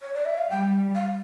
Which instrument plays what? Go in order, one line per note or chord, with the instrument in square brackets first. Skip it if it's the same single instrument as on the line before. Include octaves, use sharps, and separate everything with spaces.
[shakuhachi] C#5
D5
E5
F5
[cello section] G3 [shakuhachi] G5
[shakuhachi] F5